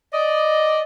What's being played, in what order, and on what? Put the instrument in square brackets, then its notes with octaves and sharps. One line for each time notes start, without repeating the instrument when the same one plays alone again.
[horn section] D5 D#5